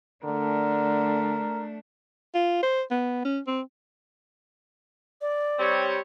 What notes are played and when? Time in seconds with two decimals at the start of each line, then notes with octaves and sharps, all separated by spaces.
0.25 D3 A3 D4 A#4
2.35 F4
2.63 C5
2.91 B3
3.25 C#4
3.47 C4
5.21 D5
5.59 G3 C4 C#5